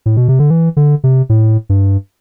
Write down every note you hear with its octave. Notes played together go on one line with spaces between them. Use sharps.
A2
B2
C3
D3
E3
D3
C3
A2
G2